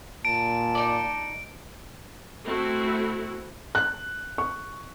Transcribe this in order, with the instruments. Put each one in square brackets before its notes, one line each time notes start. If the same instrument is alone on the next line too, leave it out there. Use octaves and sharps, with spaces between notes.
[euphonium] A#2 [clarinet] A5 [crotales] D7
[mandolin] D#4 D5
[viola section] A3 C4 E4 F#4
[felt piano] F#6
C#6